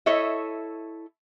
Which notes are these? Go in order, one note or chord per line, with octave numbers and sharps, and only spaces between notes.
E4 A4 C#5 D#5 E5